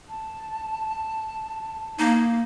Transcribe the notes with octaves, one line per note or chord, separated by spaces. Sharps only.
A5
A#3 D#4